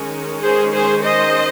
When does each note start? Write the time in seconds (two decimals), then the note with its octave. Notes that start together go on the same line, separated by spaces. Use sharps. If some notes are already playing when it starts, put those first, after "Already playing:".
Already playing: D#3 G#3 C#4
0.42 G#4 C5
0.72 G#4 C5
1.04 C5 D#5